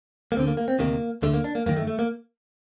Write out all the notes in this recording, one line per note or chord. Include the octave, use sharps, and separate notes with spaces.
A#3
D2 D3 C4
A#3
A#3
C4
D2 C3 D#3 A#3
D2 D3 A3
A#3
D4
A#3
F#2 D#3 A#3
A3
A3
A#3